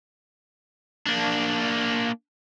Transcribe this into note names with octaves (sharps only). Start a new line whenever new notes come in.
A#3 D4